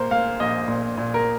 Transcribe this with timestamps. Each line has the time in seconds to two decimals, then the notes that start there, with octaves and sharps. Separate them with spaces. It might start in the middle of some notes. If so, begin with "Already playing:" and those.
Already playing: A#2 A#3 C5
0.11 A#3 F5
0.40 A#1 D#5
0.68 A#2
0.97 A#2
1.14 A#4